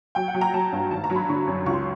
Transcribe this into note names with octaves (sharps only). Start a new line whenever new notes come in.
F#3 G5
F#5
F#3
A#5
F#3 A5
G2
G#1 A5
A#5
F#3
B5
D3 C#6
F#2
C#2 C#6
C6